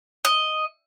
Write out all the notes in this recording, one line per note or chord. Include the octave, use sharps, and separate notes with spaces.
D#5